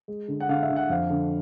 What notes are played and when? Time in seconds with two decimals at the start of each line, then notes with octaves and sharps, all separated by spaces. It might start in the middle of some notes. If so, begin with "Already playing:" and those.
0.08 G#3
0.28 D3
0.40 F#5
0.49 D3 F5
0.63 E5
0.70 D3
0.76 F#5
0.90 F2 F5
1.10 D3